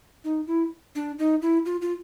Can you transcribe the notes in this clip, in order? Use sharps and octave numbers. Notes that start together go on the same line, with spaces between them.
D#4
E4
D4
D#4
E4
F4
F4